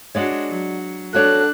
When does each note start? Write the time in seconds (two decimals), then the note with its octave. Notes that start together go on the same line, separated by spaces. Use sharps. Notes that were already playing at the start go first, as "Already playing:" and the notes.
0.15 G#3 D4 F#4 C#5 D5 F#5
0.49 F#3
1.14 D4 F#4 A4 C#5 D5 F#6